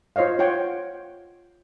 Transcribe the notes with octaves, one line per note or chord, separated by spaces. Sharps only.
F4 C5 C#5 D#5 F5
F4 C#5 F#5 G5